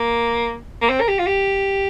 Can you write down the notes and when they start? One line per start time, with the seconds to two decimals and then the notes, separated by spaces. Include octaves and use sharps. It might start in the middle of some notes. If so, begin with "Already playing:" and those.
Already playing: A#3
0.82 A#3
0.89 C4
1.01 A#4
1.08 G4
1.19 F4
1.26 G4